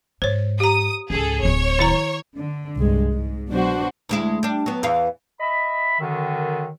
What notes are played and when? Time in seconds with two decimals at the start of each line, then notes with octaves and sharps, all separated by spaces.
0.22 G#2 C5 C#5
0.60 G4 A#5 D#6
1.10 C#2 G#2 G#4 A4
1.43 D1 F#3 C#5
1.79 D#3 E4 A#5
2.36 D3
2.77 C2 G2 G#3
3.10 G#2
3.50 B2 F#3 D4 F#4 C5
4.09 D2 G#3 E4
4.43 G3 D4
4.66 F#3 B3
4.83 E2 E3 F5
5.40 D#5 E5 B5
6.00 F#2 D3 D#3